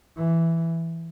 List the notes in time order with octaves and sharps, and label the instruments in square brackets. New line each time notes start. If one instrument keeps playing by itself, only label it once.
[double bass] E3